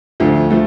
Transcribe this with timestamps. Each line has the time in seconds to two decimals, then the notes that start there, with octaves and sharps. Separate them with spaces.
0.20 D2 D3 F3 A3
0.50 F3 A3